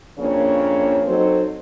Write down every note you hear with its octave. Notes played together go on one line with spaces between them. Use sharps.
F2 C#3 A#3 D4 C#5
F#3 C4 D#4 F#4 A4 C5